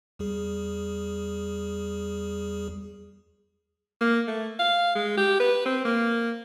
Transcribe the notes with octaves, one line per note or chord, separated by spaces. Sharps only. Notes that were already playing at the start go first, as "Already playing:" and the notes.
E2 G3 G#4
A#3
A3
F5
G#3
G4
B4
C4
A#3